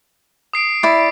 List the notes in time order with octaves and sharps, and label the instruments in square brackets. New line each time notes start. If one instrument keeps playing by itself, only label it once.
[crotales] D#6 C7 D7
[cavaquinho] E4 D5